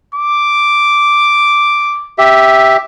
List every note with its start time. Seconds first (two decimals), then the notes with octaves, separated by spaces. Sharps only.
0.15 D6
2.18 G4 E5